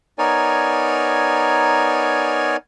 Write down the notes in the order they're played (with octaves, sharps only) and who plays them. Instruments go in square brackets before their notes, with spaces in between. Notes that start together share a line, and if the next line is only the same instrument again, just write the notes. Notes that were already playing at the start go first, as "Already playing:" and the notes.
[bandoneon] B3 D#4 A#4 C#5 D5 G#5